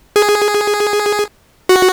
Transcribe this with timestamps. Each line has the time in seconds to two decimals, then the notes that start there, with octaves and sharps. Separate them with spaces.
0.16 G#4
1.69 F#4